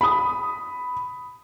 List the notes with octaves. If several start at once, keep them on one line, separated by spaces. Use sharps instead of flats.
B5 D#6